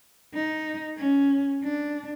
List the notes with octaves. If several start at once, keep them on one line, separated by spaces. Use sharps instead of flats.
D#4
C#4
D4